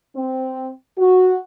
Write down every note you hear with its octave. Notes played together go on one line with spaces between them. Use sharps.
C4
F#4